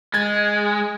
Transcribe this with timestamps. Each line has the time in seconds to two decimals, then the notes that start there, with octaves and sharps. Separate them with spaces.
0.14 G#3 G#6 A6